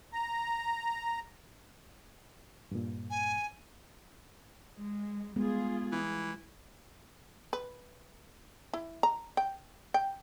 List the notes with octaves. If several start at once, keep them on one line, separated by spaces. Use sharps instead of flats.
A#5
G2 A#2
G#5
G#3
G3 G#3 B3 F4 G#4
E3
B4
E4
A#5
G5
G5